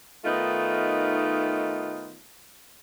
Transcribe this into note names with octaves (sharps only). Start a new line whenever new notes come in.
D#3 A3 B3 D#4 F4